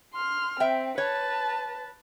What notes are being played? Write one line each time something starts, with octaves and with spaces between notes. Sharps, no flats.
C6 F6
C4 E5 G5
B4 C#5 A5